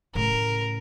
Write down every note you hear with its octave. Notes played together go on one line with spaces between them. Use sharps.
A2 C#3 A#4